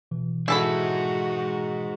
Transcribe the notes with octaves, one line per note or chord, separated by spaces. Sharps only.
B2 E3
G#3 D#4 E4 F#4 A4 B5